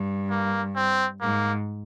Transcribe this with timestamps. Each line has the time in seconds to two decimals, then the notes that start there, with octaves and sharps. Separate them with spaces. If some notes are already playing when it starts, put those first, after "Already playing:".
Already playing: G2
0.31 A#3
0.76 C4
1.21 G#2 A#3